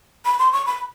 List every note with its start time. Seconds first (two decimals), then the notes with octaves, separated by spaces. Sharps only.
0.25 B5
0.39 C6
0.53 C#6
0.66 B5